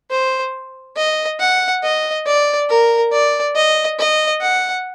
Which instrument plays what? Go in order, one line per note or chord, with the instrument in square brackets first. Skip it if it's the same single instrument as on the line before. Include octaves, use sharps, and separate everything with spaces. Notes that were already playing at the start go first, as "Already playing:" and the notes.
[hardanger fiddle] C5
D#5
F#5
D#5
D5
A#4
D5
D#5
D#5
F#5